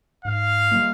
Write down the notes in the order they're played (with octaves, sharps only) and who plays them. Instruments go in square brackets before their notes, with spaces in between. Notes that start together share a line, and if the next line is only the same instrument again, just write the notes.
[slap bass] G#2 [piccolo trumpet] F5
[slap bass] G3 A#3